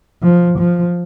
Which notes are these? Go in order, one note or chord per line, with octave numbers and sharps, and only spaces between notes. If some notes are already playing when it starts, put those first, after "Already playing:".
F3
F3